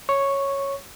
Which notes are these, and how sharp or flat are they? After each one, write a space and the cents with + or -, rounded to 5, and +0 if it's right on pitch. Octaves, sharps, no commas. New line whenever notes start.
C#5 -5 C#6 +0